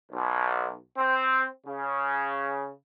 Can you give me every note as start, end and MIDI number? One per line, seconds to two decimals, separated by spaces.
0.11 0.75 35
0.98 1.44 60
1.67 2.70 49